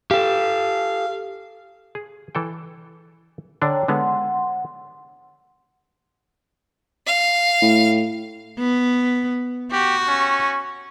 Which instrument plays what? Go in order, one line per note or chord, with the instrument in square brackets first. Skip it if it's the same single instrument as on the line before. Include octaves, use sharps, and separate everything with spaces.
[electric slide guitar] G4 A4 [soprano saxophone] F5
[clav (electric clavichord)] G#4
E3 A4 G5
[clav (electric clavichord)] D3 D4 D5 [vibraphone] C#5 G5 A#5
[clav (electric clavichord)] D3 G#3 B3 [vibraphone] F#5 C6
[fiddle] F5
[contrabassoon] A2
[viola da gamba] B3
[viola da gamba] F#4 [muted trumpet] G4
[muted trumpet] C#4